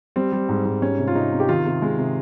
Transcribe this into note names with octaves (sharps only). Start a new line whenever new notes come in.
G3 C4
G3
G#2
G#2
G3 C#4
C3
F4
C3 D#4
C3
G4
D#3 F4
C3
G#3
C3